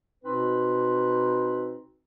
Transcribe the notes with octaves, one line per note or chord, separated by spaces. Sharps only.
B2 C4 D#4 B4